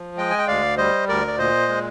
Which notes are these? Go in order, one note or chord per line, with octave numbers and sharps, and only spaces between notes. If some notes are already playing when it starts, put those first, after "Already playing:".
Already playing: F3
G#3 D#5 G5
G#5
G5
D2 D5 F5
G3 C5 D#5
D2 A#4 D5
D5
A#2 C5 D#5
G#3